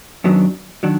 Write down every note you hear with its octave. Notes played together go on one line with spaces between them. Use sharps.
F#2 D#3 F#3 B3 D4
D#3 F#3 D4